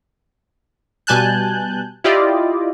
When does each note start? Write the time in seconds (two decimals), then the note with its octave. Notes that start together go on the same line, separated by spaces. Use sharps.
1.07 B2 G3 G#5 A5 F#6 G6
2.04 E4 F4 G4 D5 D#5